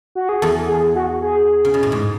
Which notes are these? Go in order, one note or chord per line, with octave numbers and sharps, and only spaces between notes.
F#4
G#4
E2 A4
G#4
F#4
G#4
C#3
B2
A2
G#2